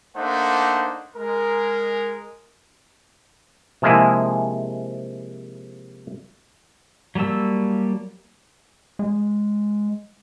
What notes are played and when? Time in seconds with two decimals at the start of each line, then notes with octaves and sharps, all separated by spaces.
0.17 A3 A#3 D4 D#4 C5 F#5
1.17 G#3 A#4
3.82 C3 F3 G#3 A#3 E4 G#4
7.15 F#3 G3 A#3 A5 E6
8.99 G#3